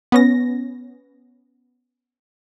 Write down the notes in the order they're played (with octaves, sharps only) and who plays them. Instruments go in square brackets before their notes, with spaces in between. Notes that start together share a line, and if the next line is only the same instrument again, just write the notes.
[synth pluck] B3 C#4 A#6